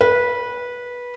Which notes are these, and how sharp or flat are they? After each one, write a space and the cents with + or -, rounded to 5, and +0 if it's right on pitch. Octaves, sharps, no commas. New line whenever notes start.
B4 -20